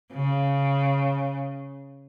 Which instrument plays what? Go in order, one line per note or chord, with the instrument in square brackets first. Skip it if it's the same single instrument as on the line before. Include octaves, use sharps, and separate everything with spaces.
[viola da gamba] C#3